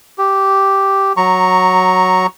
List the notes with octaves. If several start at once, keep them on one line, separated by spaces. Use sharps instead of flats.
G4
F#3 A#5 C#6